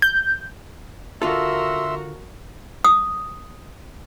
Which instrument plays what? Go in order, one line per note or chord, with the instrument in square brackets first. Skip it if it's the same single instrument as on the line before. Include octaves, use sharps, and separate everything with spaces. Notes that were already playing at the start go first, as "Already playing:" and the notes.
[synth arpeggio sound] G6
[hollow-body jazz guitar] D3 F4 A4 [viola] F#4 A#4 [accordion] E5 C6 E6
[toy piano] D#6